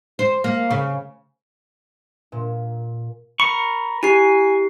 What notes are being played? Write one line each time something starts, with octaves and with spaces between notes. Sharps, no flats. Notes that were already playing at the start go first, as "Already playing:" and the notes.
C5
A#3
C#3
A#2
A#4 B5 C#6
E4 G4 G#5 C7